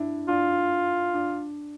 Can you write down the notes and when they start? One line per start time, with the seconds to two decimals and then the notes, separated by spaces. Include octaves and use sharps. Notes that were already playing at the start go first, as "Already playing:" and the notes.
Already playing: D4 E4
0.28 D4 F4
1.14 D4